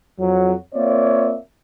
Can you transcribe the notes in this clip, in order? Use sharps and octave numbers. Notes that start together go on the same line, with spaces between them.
F2 F#3
A#3 C4 F4 C#5 D5 E5